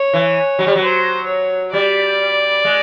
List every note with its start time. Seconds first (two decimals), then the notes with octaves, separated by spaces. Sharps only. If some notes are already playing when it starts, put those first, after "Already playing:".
Already playing: C#5
0.14 E3
0.59 F#3
0.67 G3
0.76 F#3
0.82 C5
1.27 C#5
1.73 G3 D5
2.65 G#3